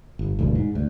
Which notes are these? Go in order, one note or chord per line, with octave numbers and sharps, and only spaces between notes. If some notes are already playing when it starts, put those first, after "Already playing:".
G1
E1 D2 G2
G#2
D2